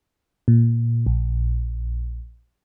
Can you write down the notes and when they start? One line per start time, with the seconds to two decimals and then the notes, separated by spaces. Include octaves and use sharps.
0.48 A#2
1.06 A#1